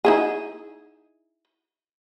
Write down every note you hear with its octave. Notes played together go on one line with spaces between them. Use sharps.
D#4 E4 G#4